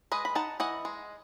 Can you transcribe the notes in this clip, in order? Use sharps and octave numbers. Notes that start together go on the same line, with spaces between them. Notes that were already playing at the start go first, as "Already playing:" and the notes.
G#3 B4 D#5
B5
D#4 F#5 A5
E3 D#5 F#5
G#3